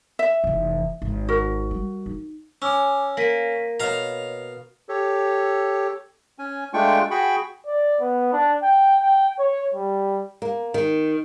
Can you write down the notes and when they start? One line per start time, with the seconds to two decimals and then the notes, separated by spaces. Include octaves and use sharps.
0.19 E5
0.44 F1 E3
1.02 G#1
1.29 F#4 A#4
1.71 G3
2.06 D#4
2.62 C#4 G#5 D6 E6
3.17 A#3 A#6 B6 D#7
3.80 B2 C#5 D#5 F5 A#5
4.89 G4 A4 C#5
6.39 C#4 G#5
6.74 G#3 A3 D4 F4 G5 C#6
7.11 F#4 G#4 G5 B5 C#6
7.66 D5
8.00 B3
8.33 D4
8.62 G5
9.02 G5
9.39 C#5
9.74 G3
10.42 A#3
10.74 D#3